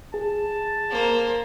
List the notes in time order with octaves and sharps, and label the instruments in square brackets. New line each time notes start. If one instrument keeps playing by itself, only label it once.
[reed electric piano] G#4 [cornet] A5
[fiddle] A#3 C5